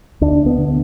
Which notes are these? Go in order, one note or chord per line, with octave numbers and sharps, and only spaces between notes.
D2 D4
B3
D3